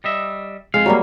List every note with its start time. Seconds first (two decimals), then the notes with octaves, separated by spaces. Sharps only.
0.04 G3 D#5 E5
0.74 F2 G#3 F5
0.86 F#3 G3 A#3